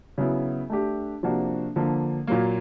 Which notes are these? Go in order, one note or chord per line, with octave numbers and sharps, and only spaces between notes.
C#3 F#3 B3 E4
A3 D4 G4
C3 F3 A#3 D4 F#4
D3 F3 A#3
A#2 F#3 A#3